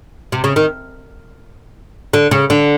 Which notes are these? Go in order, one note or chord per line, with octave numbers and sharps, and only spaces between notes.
C3
C#3
D#3
D3
C#3
D3